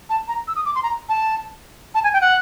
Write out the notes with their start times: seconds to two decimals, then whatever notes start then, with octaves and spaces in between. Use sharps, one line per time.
0.09 A5
0.28 A#5
0.47 E6
0.56 D#6
0.66 D6
0.75 C6
0.83 A#5
1.09 A5
1.94 A5
2.04 G#5
2.13 G5
2.21 F#5